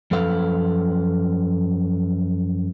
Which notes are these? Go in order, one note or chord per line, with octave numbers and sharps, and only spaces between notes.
F#2 F3 A4 B4 F5